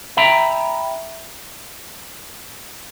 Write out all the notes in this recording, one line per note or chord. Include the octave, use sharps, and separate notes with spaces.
E5 G5 A#5 B5